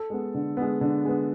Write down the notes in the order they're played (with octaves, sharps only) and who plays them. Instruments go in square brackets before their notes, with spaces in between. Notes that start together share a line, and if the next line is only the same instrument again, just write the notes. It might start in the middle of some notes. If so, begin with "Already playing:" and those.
Already playing: [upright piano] A4
G#3 B3
D3
G#3 B3
D3
G#3 B3